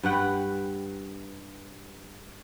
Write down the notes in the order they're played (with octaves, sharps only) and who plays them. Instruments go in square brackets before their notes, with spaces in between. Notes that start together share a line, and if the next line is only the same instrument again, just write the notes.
[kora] G2 B4 F#5 G5